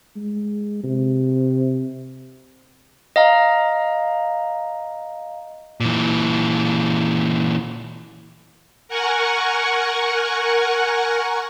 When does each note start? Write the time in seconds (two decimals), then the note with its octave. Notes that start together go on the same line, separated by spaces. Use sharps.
0.16 G#3
0.84 C3
3.16 D#5 F5 A#5
5.80 A#2 E3
8.88 A#4 F#5 G#5 C#6